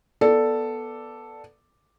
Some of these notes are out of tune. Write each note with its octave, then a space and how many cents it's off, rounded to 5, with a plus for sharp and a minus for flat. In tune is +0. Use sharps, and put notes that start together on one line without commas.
B3 -10 A4 +0 D5 +0